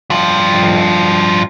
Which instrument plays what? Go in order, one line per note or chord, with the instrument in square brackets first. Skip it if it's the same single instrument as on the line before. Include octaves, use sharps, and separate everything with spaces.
[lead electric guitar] G2 F3